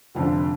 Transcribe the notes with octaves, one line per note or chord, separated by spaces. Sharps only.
F1 F2 D3